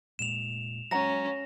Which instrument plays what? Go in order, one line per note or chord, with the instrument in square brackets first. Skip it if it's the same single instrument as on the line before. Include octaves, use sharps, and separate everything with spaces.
[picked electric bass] F1 A#2 G#3 [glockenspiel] E7 F7
[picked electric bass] F#3 G#3 [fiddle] C#4 [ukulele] F#5 A#5 [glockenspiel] A#6